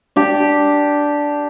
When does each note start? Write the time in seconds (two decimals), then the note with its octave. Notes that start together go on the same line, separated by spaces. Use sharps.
0.16 D4 G4